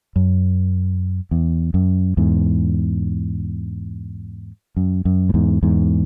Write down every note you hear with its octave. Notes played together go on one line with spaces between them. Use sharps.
F#2
E2
F#2
E2 G#2
F#2
F#2
A2
E2 G#2
E2 G#2